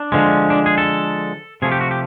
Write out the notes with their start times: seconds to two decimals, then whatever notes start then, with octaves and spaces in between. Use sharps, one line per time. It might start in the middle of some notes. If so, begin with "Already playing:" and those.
Already playing: D4
0.12 D3 F3 G#3
0.50 D4
0.66 G#4
0.78 A4
1.62 C3 F3 A3 G#4
1.72 G4
1.81 F#4
1.91 G4